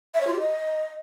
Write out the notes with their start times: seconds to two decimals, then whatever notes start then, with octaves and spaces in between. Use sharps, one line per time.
0.14 E5
0.21 C#5
0.27 F4
0.33 G4
0.40 D#5